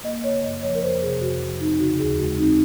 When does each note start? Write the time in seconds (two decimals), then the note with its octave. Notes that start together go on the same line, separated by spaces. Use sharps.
0.04 A#3 D#5
0.24 C#3 C#5
0.43 F#2 D#5
0.63 F3 C#5
0.75 A#4
0.81 F2 C5
1.01 C3 G#4
1.21 F2 F#4
1.40 F3
1.60 C4 D#4
1.79 C#3 F#4
1.99 D#2 G#4
2.18 G#3 F#4
2.38 C4 D#4